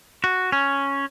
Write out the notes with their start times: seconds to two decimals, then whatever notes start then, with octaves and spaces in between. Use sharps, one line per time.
0.24 F#4
0.52 C#4